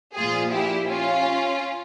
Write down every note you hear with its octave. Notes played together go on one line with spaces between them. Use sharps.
A#2 F3 F4 G#4
E4 G4
C#4 F4